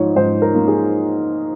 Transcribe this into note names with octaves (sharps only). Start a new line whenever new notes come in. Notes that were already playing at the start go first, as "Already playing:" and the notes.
Already playing: G#2 F3 C#5
G#2 C5
A#4
A#3
G#4